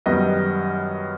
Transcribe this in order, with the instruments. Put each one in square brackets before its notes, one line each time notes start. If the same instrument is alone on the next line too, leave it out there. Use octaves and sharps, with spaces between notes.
[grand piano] F#2 D#3 G3 B3 D#5